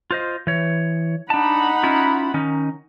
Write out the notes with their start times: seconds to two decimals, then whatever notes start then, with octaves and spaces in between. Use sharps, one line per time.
0.11 F4 C5 D#5
0.47 E3 C#5
1.30 D4 D#4 F#5 A5 B5
1.83 C#4 E4 F4
2.34 D#3 C#4 D#4